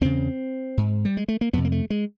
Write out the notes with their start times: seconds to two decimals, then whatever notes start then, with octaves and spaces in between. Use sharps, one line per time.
0.01 E2 C#3 C4
0.77 G#2
1.05 G3
1.17 G#3
1.28 A3
1.41 A#3
1.53 F2 C3 B3
1.65 A#3
1.72 A3
1.90 G#3